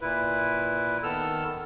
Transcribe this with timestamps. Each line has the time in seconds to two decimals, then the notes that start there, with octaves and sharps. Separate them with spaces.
0.01 A#2 E4 B4
1.03 D#3 B3 A4 E6 F6